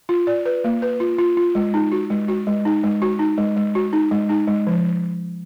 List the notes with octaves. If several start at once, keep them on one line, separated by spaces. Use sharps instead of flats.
F4
D5
B4
A#3
B4
F4
F4
F4
G#3
D#4
F#4
G#3
F#4
G#3
D#4
G#3
F#4
D#4
G#3
G#3
F#4
D#4
G#3
D#4
G#3
F3